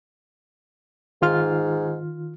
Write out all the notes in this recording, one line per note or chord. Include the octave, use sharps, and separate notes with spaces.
G#2 D#3 F4 F6